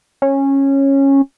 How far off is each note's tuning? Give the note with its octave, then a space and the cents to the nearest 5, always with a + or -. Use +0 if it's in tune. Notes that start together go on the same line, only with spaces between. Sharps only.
C#4 -15